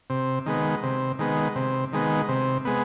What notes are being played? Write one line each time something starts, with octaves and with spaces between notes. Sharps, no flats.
C3
D#3 G#3 B3
C3
D#3 G#3 B3
C3
D#3 G#3 B3
C3
G#3 B3